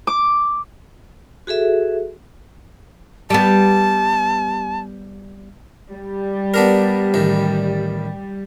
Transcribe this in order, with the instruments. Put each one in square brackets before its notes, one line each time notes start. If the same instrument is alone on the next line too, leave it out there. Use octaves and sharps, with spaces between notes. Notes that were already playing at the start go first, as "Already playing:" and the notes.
[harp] D6
[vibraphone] F#4 G#4 A4 E5
[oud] G3 B3 [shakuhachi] A5
[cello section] G3
[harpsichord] B3 D4 A#4
A1 D#3